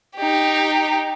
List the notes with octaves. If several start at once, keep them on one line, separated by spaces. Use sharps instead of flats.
D#4 G4